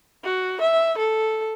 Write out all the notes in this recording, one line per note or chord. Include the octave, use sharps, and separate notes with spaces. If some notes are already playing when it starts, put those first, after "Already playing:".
F#4
E5
A4